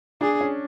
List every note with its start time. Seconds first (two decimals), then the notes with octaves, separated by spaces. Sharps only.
0.21 D4 G#4
0.41 C#4